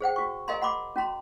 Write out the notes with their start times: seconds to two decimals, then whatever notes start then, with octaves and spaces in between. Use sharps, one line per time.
0.01 G#4 C5 F#5 G5
0.16 F#4 C#6
0.48 A#4 D#5 F5 G#5 A#5 C6
0.62 F#5 B5 C6 D6
0.96 C#4 F#4 A#5 C6